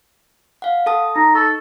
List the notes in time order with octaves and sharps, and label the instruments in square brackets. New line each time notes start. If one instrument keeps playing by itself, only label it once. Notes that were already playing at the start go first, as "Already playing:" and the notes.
[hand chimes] F5 F#5
A4 A5 D#6
[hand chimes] D#4 [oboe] A#5
[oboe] A4 [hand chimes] C#6